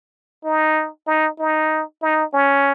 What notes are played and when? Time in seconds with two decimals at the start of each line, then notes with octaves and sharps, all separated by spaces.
0.45 D#4
1.07 D#4
1.39 D#4
2.02 D#4
2.34 C#4